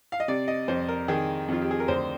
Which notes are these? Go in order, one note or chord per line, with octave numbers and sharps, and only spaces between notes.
F5
D#5
C3 D5
D#5
F2 C5
A#4
D#3 G#4
F2 F4
G4
G#4
A#4
D2 C5